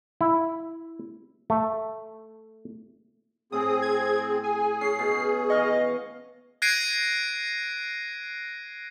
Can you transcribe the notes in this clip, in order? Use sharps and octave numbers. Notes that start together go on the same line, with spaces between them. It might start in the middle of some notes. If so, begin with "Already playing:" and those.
E4
A3
A2 C4 G#4 D#6
G#6
G#4 G#5
C#4 C7
B2
E3 D#5 F5 C#6
F#6 G#6 A#6 C7 D7 D#7